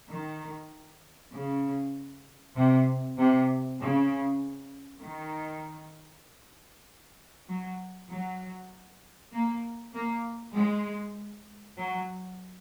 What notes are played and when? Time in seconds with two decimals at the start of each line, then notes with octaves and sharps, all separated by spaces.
0.10 D#3
1.34 C#3
2.56 C3
3.18 C3
3.79 C#3
5.02 D#3
7.48 F#3
8.09 F#3
9.32 A#3
9.93 A#3
10.55 G#3
11.78 F#3